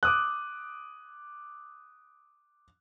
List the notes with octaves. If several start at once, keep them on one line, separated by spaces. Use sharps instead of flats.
D6 D#6 F#6